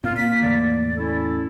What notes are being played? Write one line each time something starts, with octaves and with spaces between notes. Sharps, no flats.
A#2 C4 F4
A#3 B6
E2 A2 D3 D5
C#4 E4 A4